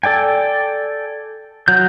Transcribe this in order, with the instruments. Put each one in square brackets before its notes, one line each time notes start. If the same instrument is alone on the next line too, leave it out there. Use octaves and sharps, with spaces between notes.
[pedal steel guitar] A4 D5 G5 G#5
F#3 G6